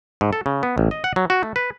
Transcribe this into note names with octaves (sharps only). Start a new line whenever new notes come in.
G#2
A4
C#3
B3
A1
D#5
F#5
F#3
F#4
A3
B4